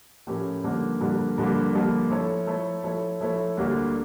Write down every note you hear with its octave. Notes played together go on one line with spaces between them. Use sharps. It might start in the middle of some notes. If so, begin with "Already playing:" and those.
A2 F3 C#4 G4 A#4
G2 D3 F3 A#3
G2 D3 F3 A#3
G2 D3 F3 A#3
G2 D3 F3 A#3
F3 A3 E4 A4 C#5
F3 A3 E4 A4 C#5
F3 A3 E4 A4 C#5
F3 A3 E4 A4 C#5
D2 D3 G3 A#3 D4